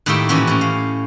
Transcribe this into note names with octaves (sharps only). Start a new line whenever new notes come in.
A2 D#3 A#3 G4 E5 G5
A#2 E3 C#4 E4 F#4 G4
A2 C#4
F5